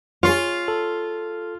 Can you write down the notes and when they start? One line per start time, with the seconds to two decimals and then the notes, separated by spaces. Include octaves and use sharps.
0.23 F4 G#4 C#5
0.68 A4